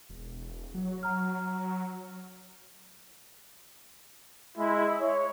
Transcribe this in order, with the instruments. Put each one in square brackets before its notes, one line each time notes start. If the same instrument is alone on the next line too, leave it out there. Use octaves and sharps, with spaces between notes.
[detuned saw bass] E1
F#3
[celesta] A#5 F6
[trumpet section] G#3 E4
C#5